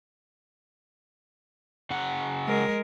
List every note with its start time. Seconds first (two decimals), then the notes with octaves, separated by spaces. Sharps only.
1.90 C#3 F#3 F#5
2.47 G#3 A#4